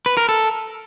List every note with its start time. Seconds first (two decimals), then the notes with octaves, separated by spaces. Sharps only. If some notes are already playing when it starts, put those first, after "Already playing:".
0.06 B4
0.17 A#4
0.29 A4